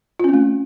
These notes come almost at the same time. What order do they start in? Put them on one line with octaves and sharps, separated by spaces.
F4 C#4 C4 A3